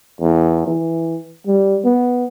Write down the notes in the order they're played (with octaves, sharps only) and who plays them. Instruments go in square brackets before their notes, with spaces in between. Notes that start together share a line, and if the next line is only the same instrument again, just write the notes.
[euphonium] E2
E3
G3
B3